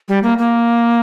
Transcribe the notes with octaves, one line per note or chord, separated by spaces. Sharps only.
G3
A#3
A#3